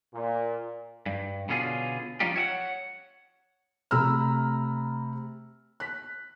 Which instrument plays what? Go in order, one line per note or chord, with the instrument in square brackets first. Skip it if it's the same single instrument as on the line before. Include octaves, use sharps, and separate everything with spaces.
[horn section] A#2
[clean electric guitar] G2
B2 D3 C#4 F4 G#4
F3 G3 C#4 D#4 F4 G4
C#5 E5 F#5
[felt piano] C3 A3 A#5 B5 E6 F6
F#6 B6